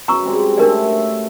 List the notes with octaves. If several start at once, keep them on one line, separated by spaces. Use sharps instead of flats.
F#2 B4 C#5 A#5 C#6 E6
G3 G#3 C4
A3 D4 A#4 C#5 D5 E5